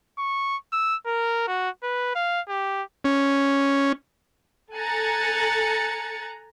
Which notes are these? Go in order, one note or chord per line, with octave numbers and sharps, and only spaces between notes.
C#6
E6
A#4
F#4
B4
F5
G4
C#4
A4 G#5 A#5 F#6 A6 C#7